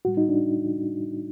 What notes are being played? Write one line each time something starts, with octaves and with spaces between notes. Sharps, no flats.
A2 G3 F#4
D#4
D4